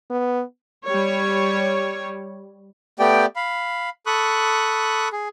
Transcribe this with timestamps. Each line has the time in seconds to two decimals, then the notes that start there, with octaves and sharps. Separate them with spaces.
0.11 B3
0.87 G3 C#5
2.99 A3 B3 G4 D5 G5
3.36 F5 B5
4.06 A4 B5 C#6 D#6 F#6
5.12 G#4